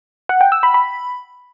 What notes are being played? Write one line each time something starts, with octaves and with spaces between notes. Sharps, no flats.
F#5
G5
E6
B5
B5